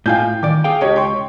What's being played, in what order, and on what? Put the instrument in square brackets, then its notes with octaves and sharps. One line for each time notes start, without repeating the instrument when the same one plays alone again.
[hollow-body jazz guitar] A2 F4 F5 [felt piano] G5 G#5 G6
[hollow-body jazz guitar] D#3 D5 [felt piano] D6
[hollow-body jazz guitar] G#4 F5 G5
[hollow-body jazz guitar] C#2 [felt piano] G4 C#5 D#5
[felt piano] G5 C6 C#6